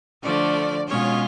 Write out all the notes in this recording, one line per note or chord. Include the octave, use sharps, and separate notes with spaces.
D3 F3 A3 D5
B2 G#3 C#4 F4 C#5